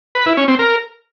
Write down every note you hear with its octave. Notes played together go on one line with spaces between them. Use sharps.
B4
E4
C#4
C4
A#4